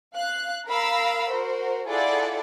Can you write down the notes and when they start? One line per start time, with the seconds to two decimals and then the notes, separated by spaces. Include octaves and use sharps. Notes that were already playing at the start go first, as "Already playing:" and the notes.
0.14 F5 F#6
0.67 A#4 F5 A#5 B5 E6
1.29 F#4 A#4 C5
1.87 E4 F4 G#4 A4 D5 F#5